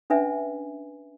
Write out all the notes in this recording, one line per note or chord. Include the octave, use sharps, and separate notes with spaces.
C#4 D4 B4 E5 G#5